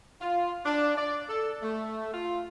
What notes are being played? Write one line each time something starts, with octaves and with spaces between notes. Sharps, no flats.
F4
D4
D5
A4
A3
F4